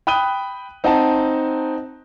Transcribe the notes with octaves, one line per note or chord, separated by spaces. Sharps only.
G5 B5 D#6 F#6 D#7 G7
C4 D#4 D#5 F#5 A5